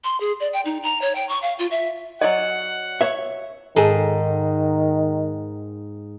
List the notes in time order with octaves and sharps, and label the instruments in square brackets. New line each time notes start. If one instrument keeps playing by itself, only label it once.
[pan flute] C6
G#4
D5
G5
D#4
A#5
C#5
G5
C#6
F5
F4
E5
[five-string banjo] F#3 D5 G#5 [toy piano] D#5 [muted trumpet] F#5
[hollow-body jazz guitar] C#5 E5
[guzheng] G#2 [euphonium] D#3 [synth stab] G#4 A4